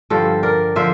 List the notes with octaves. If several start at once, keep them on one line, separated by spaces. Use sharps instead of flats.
G2 D3 F3 A4 C5
A#4 D5
D3 F3 C5 E5